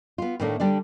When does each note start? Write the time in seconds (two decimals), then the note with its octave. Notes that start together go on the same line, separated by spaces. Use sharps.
0.18 B3 F4
0.40 A2 D#3 A3 A#3 D4
0.60 D3 G3 D4 D5